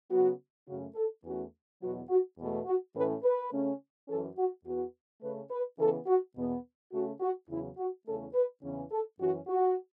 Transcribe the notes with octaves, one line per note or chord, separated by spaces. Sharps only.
C#3 F#3 B3 F#4
F#2 C#3 A3 C#4 F#4
A4
E2 E3 A3 C#4 F#4
E2 B2 F#3 B3 F#4
F#4
E2 B2 A3
F#4
A2 E3 A3 C#4 B4
B4
C#3 A3 C#4
F#2 E3 C#4 A4
F#4
E2 E3 B3 F#4
C#3 A3 C#4 B4
B4
C#3 E3 B3 A4
F#4
E2 B2 B3
C#3 A3 C#4 F#4
F#4
E2 C#3 F#3 E4
F#4
E2 C#3 A3 C#4 A4
B4
E2 C#3 E3 C#4
A4
F#2 E3 C#4 F#4
F#4